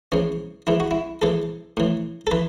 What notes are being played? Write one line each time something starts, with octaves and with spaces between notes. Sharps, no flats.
G#2 E3 C#4
G#2 E3 E4
F#4
E4
G#2 E3 A4
A2 E3
A4
E3 B4